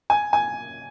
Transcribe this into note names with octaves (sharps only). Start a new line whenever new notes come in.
G#5
G#5